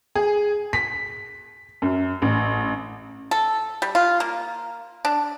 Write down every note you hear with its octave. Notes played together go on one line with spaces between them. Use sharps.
G#4
B6
F#2
A1
A4
G3
F4
A#3
D4